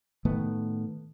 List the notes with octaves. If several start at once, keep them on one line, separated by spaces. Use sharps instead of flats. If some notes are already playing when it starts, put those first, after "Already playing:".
A2 D#3 A3 B3